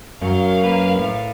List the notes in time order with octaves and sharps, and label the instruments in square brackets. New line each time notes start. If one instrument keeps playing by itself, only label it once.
[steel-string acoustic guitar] F#2 [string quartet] F#3 [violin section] A#4 F5
[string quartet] A#3 B4
A2